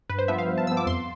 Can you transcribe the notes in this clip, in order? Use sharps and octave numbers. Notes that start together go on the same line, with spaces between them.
G2 B4
C5
F3 B3 E5
F5
G2
A5
F3 B3 E6
D6
F2 C6